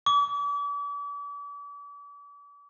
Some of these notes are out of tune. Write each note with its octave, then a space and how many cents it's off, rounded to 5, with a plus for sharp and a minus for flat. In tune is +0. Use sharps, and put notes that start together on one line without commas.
D6 -40